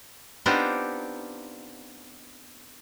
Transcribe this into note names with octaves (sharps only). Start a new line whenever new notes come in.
B3 C4 D4 D#4 F4 G4